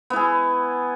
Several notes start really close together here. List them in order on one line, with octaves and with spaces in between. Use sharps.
B3 E4 G#4